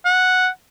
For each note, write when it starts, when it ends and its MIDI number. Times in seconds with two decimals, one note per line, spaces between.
0.05 0.48 78